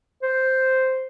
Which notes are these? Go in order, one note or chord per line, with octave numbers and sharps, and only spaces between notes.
C5